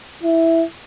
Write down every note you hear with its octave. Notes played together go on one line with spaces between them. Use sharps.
E4